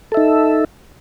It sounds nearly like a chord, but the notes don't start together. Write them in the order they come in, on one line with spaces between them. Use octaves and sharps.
A4 E5 D#4